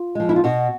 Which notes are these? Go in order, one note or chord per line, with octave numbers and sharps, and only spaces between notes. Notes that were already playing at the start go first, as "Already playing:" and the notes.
Already playing: F4
F3 G#3
E4
F4
B2 F#4